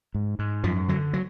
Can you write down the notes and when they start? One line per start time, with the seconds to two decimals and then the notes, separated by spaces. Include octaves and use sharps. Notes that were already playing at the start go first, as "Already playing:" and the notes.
0.14 G#2
0.39 G#2
0.64 F#2 F3
0.88 D3 F#3
1.13 F#3